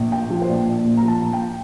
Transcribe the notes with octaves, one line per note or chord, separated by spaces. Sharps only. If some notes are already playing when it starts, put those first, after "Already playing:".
Already playing: A#1
A#2 G5
F3
C5
A#1 D5
A#1
A#2
A#5
F3
A5
A#1
G5